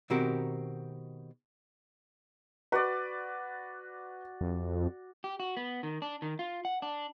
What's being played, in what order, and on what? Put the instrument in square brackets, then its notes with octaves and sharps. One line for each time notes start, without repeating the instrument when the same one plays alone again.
[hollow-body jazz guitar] B2 D#3 C4 F#4 G4 A#4
[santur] F#4 D5 [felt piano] B4
[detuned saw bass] F2
[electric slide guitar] G4
F#4
B3
D#3
D4
D#3
F4
F#5
D4